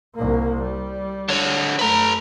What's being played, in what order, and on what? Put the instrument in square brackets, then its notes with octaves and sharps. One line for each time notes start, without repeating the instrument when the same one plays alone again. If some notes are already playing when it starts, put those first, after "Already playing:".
[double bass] C2 A#3
G3
[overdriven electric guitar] D3 C#5
[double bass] F#2 A3 [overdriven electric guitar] B4 A#5